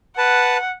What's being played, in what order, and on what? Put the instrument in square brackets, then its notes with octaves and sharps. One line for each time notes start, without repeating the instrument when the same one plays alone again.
[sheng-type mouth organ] B4 A5 [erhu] F#5